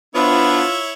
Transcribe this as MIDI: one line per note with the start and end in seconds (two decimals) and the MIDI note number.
0.15 0.64 53
0.15 0.64 59
0.15 0.64 62
0.15 0.93 64
0.15 0.80 65
0.15 0.68 71
0.15 0.93 73
0.15 0.93 76